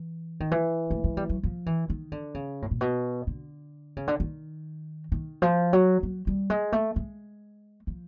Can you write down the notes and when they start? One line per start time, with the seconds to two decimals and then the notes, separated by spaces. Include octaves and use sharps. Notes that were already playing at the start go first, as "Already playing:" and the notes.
Already playing: E3
0.40 D#3
0.51 E3
0.91 A3
1.04 G#3
1.17 G3
1.29 F#3
1.43 F3
1.66 E3
1.90 D#3
2.12 D3
2.34 C#3
2.62 A2
2.71 A#2
2.81 B2
3.27 D3
3.97 C#3
4.08 D3
4.20 D#3
5.12 D#3
5.42 F3
5.73 F#3
6.03 F#3
6.27 G3
6.50 G#3
6.72 A3
6.96 G#3
7.87 F3